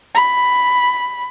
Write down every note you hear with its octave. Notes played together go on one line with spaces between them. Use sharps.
B5